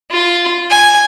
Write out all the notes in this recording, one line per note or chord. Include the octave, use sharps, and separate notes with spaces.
F4
G#5